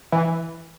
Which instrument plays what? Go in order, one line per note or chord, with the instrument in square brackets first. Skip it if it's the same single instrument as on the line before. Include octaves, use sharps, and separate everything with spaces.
[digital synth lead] E3